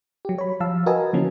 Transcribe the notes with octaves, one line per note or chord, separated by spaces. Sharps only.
F#3 G4
C#5 B5
F3 F5 A5 E6
F#4 A#4 B4 D#5 G#5 A5
D3 E3 F3 A#3 C#4